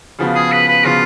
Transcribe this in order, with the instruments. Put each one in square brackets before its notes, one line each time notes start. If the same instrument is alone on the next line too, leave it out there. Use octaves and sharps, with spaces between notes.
[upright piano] C#3 F3 B3 F#4
[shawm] G#4
B4
B4
[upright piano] C#3 F3 B3 F#4 [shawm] F4